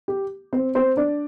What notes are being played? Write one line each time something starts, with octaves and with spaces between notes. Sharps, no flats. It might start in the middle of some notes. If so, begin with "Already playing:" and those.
G4
C4 C5
C4 C5
D4 D5